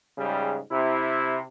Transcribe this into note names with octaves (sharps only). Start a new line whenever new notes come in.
G#2 C#3 G3
C3 E4